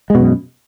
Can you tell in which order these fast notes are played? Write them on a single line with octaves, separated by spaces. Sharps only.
G#3 B2 F#2